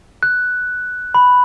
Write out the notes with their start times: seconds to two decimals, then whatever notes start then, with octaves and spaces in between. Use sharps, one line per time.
0.23 F#6
1.15 B5